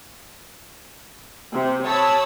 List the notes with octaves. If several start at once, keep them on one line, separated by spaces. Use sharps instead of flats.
C3
C#5 A5 B5 D#6 E6